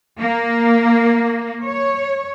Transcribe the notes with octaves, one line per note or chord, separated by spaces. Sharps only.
A#3
C#5